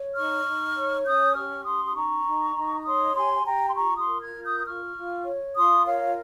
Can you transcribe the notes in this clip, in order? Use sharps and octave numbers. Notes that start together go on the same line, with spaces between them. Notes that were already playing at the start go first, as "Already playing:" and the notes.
Already playing: C#5
D#4 C#6 F6
D#4
C#5
C#4 D#6 G6
G4 C#6 F6
C#4 C6 D#6
D#6
D#4 A#5 C#6
D#4
D#4
C#5 C6 D#6
G4 G#5 C6
G#5
G4 G5 A#5
C6
F4 A#5 C#6
C6 D#6
A#4
F6 G#6
F4
D#6 G6
D#6
F4 C#6 F6
F4
C#5
F4 C6 D#6
A#4 C#5 F5